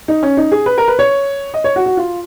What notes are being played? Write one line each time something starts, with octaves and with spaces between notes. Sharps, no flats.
D#4
C#4
D#4
G#4
B4
A#4
B4
C#5
D#5
C#5
F#4
F#4
F4